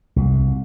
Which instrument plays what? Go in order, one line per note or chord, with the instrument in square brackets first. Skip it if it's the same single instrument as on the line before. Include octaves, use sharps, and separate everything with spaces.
[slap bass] C2